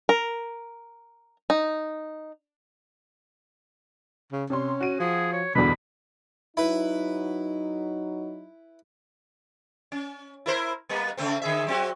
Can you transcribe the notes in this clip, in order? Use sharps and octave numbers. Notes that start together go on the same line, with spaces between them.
A#4
D#4
C#3
C3 C#4 C6
F#4 D#7
F3 G#4
C#5
E2 G2 B2 D3 B5
F#3 D#4 E4 B4
C#4
E4 A#4 C5
G3 A#3 B3
C#3 A3 C4
D3 G#4 E5
F#3 C4 F#4